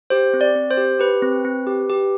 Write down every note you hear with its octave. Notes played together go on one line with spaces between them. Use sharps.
G4 C5
C4
D5
C4
C5
G4
G4 B4
C4
C4
G4
G4